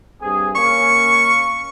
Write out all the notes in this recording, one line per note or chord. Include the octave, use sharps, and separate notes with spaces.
G2 C4 G#4
A#3 C#4 C#6